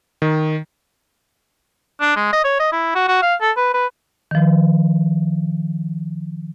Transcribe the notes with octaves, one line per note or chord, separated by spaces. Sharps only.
D#3
D4
G#3
D#5
C#5
D#5
E4
F#4
F#4
F5
A4
B4
B4
D#3 F3